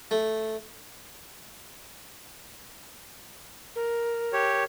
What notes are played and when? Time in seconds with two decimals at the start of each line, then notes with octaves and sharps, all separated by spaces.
0.11 A3
3.75 A#4
4.33 G4 C#5